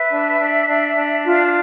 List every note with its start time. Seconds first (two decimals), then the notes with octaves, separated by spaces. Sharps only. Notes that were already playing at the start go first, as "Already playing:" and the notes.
Already playing: B4 E5
0.09 D4
0.38 D4
0.67 D4
0.95 D4
1.24 F4